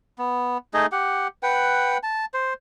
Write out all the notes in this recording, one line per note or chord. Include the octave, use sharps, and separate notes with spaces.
B3
A3 D#4 G#4 D#5
G4 F#5
B4 F#5 G5
A5
C5